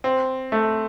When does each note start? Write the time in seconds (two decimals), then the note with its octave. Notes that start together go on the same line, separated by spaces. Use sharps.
0.04 C4
0.52 A3